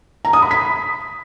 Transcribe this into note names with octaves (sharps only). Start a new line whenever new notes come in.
A#5
D#6
B5
B6